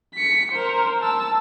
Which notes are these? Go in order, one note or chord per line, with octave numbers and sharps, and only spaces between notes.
B6 C#7
A#4 C5
A5 E6